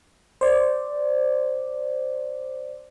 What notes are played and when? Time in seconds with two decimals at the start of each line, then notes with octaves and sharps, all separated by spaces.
0.41 C5 D5